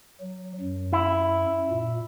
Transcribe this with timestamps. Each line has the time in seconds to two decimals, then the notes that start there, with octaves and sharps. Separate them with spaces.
0.20 F#3
0.61 F#2
0.93 E4
1.71 A#2